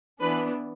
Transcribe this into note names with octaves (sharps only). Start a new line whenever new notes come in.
E3 B3 D4 B4